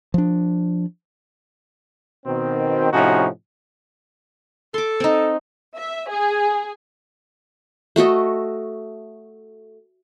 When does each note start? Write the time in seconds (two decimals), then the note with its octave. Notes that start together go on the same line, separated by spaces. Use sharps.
0.14 F3 D4
2.26 B2 D#3 C4
2.93 A2 C3 F3 C#4 D#4 F#4
4.74 A4 C6 D6
5.00 C4 D#4
5.76 E5
6.09 G#4
7.96 A3 F#4 A4 D#5